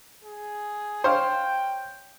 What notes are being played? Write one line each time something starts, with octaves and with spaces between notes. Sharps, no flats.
G#4
C5 C#5 F5 G5